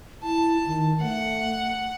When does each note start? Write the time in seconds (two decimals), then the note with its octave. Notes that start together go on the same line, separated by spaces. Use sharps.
0.23 E4 A5
0.66 D#3
1.01 A3 F#5